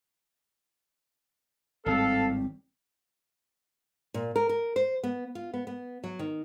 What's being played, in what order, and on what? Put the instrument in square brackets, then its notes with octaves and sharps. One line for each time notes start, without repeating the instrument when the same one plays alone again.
[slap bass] G#1 A2 G3 [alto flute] C4 [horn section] A4 [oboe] F5
[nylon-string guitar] A#2
A#4
A#4
C5
B3
F4
B3
B3
F#3
D#3